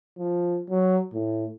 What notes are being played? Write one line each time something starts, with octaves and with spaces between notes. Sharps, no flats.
F3
F#3
A2